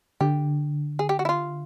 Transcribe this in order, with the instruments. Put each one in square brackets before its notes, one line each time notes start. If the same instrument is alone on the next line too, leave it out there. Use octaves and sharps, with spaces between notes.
[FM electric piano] D3 [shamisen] G4
[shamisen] G#4
G4
F#4
E4
F4